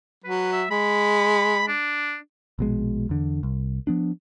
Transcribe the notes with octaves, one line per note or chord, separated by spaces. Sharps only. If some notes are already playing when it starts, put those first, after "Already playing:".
F#3 B4
E5
G#3 B5
D4
A#1 B2 G#3
E2 D3
C2
F3 B3 D4